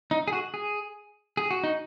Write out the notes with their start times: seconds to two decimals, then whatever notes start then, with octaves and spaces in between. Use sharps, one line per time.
0.11 D#4
0.28 G#4
0.33 F#4
0.54 G#4
1.37 G#4
1.51 F#4
1.64 D#4